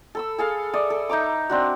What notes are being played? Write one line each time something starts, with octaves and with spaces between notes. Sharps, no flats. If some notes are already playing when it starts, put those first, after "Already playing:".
A4 B5 E6
G#4 A4 F5
D5 E5 D#6
A4
D#4 E5 A#5 D6
C4 D4 F#4